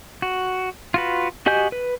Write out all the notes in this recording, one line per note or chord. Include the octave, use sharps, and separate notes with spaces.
F#4
F4 F#4 B4
F#4 G4 D#5 G#5 G6
B4